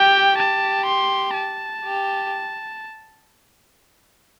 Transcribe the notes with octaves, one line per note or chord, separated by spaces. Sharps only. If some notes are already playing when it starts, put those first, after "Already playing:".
Already playing: G4 G5
G4 A5
C6
A5
G4